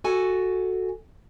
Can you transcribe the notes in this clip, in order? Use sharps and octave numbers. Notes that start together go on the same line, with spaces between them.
F#4 A4 G#5